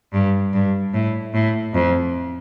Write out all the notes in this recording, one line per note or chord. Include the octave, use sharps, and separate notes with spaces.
G2
G2
A2
A2
F2